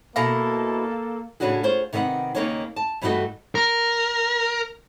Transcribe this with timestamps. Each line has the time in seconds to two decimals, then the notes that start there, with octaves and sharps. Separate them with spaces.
0.16 B2 A#3 E4 A4 F5 A#5
1.40 A2 C#3 C#4 D4 F#4 G#4
1.63 F4 G#4 C5 C#5
1.93 C3 D#3 B3 E5 F#5
2.35 D#2 C#3 A#3 D#4 C#5 G#5
2.76 A5
3.02 G2 E3 G3 A3 F#4 D#5
3.55 A#4